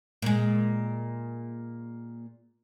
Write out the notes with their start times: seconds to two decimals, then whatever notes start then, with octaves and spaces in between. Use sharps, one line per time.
0.22 A#2 G#3